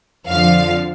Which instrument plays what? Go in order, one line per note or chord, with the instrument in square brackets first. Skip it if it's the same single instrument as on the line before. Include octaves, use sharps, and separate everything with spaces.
[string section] F2 D3 F3 F5